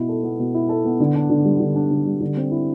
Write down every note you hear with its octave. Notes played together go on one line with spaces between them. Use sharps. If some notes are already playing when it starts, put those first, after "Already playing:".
Already playing: B2 E4
A4
B3
B2
E4
A4
B3
D3
D4
D3
G3
D3
D4
D3
G3
D3
C4
E4